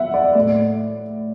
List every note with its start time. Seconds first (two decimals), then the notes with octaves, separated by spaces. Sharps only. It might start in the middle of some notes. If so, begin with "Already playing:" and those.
Already playing: B3 E5 F#5
0.14 D5
0.35 A2 A3 D5